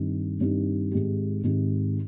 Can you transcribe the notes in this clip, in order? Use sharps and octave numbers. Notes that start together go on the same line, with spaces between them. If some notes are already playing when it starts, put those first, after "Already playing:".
Already playing: G2 D#3 G3 C4 D#4
G2 D#3 G3 C4 D#4
G#2 D#3 G#3 C4 G4
G#2 D#3 G#3 C4 G4